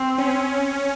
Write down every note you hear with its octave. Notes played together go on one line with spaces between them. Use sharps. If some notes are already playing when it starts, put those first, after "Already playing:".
Already playing: C4
C#4